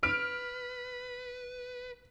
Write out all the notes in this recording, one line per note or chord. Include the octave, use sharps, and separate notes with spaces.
B4 F6 D7